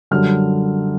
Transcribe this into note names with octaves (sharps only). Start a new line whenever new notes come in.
F#2 D3 G3 F6